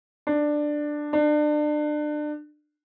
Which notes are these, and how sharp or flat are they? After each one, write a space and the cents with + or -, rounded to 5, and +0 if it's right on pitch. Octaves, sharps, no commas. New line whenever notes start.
D4 +10
D4 +30